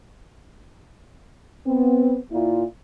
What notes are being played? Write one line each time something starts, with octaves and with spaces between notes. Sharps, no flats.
B3 C4
A#2 E4 F4